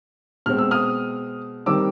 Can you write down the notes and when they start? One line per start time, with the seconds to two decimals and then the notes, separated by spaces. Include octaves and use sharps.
0.46 B2 G#3 C4 F6
0.58 E6
0.71 D#6 F6
1.66 D#3 G3 C4 D6 E6